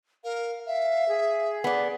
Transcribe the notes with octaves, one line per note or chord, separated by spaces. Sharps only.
A#4 F5
E5 F5
G#4
B3 D5